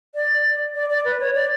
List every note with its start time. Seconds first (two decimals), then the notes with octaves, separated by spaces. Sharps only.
0.15 D5
0.75 D5
0.90 D5
1.05 B4
1.20 C#5
1.35 D5